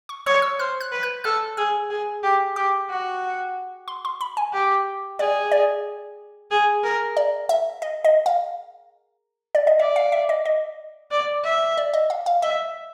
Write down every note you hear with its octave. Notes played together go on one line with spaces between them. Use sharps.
C#6
C#5 D#6
E6
C5 F6
F#6
B4
F#6
A4 F6
G#4 E6
G#4
G4
G4 D6
F#4
C6
C6
B5
G#5
G4
G#4 D5
D5
G#4
A#4
D5
E5
D#5
D#5
F5
D5
D#5
D5 E5
F5
E5
D#5
D#5
D5
E5
D5
D#5
F5
F5
D#5 E5